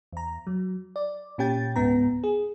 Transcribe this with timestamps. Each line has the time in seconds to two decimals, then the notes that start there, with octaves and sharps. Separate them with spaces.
0.13 E2 A#5
0.47 F#3
0.96 D5
1.38 A#2 C#4 G4 G5 A6
1.76 C#2 G#2 B3 A#5
2.24 G#4